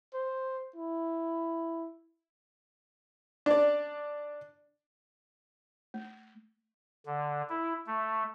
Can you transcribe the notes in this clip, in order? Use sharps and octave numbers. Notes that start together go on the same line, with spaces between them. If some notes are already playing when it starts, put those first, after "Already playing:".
C5
E4
D4 D5
A3
D3
E4
A3